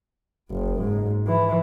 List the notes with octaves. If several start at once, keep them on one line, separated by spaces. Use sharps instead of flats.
F#1
G#2
E3